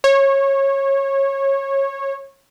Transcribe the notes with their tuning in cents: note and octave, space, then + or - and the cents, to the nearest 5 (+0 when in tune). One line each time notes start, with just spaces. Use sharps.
C#5 -20